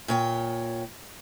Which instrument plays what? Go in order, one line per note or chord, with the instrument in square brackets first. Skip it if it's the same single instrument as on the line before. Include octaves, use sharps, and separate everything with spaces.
[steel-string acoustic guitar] A#2 C#5 G5